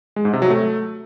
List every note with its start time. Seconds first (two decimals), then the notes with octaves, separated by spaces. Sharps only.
0.16 G#3
0.25 G#2
0.33 C3
0.42 F#3
0.50 A3